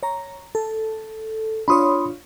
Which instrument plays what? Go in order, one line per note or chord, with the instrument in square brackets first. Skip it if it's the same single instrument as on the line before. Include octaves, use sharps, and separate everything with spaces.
[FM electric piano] C#5 A#5
A4
[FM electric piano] D4 F4 C#5 [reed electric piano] B5 C6 D#6